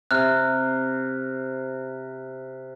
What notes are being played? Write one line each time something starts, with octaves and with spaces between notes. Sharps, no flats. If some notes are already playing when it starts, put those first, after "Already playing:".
C3 F6 F#6